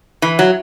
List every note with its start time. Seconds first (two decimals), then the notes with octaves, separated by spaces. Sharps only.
0.22 E3
0.39 F#3